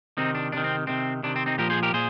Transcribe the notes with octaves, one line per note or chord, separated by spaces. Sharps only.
C3 D#3 C4 D#4
D4
C3 D#3 D4
C4
C3 D#3 C4
C3 D#3 D4
C4
C4 D#4
A#2 F3 G4 A#4
G#4 C5
G4 A#4
A#2 G#4 C5